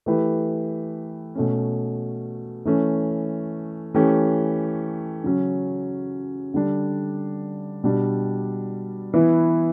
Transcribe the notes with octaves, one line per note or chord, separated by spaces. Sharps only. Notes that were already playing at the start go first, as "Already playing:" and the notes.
E3 A3 E4 G4 B4
B2 A3 C#4
E3 A3 C#4
E3 A3 C#4 G4
C#3 F#3 C#4
D3 G3 D4
B2 G3 D4 G4
E3 B3 E4